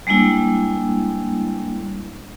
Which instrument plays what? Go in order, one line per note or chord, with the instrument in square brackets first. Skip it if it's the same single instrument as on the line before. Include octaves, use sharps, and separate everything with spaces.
[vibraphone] G3 G#3 A#3 D4 E4